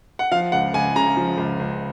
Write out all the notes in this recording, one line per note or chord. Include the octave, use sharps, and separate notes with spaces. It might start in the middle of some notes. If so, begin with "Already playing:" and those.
F#5
F3 F5
C#2 F#5
C#2 G#5
C#3 A#5
F3
C#2
C#2